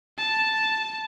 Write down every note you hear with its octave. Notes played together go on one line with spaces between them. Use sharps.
A5